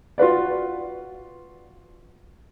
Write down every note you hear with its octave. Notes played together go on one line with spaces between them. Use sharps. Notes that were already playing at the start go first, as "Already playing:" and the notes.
F4 F#4 B4 D5